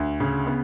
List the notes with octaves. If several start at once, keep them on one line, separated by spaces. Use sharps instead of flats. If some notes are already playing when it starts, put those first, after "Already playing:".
Already playing: D2
C#3
B3